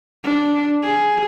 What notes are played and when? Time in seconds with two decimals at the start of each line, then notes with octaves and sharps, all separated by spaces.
0.24 D4
0.83 G#4